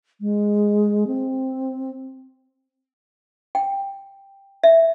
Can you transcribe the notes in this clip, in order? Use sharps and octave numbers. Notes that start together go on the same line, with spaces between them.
G#3
C4
G5
E5